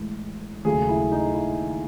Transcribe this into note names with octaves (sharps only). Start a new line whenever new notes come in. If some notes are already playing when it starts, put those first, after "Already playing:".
Already playing: A2 E3 G#3
D#2 C#3 F#3 A3 G#4
E4
D#4
E4